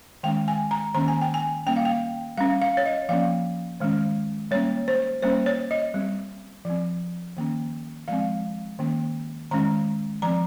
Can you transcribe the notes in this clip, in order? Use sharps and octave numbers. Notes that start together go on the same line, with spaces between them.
D#3 G#3 C#4 G5
G#5
A#5
D#3 A#3 C#4 A#5
G#5
G5
G#5
G3 A#3 C#4 G5
F5
G5
G3 C#4 F5
F5
C#5
D#5
F3 A#3 C#4 F5
D#3 G#3 C#4
G3 A#3 C#4 C#5
C5
G3 A#3 C#4 C5
C#5
D#5
G3 C4
F3 C4
D#3 A#3 C#4
F3 G#3 C4 F5
D#3 A#3 C#4
D#3 G#3 C#4 A#5
F3 C4 A#5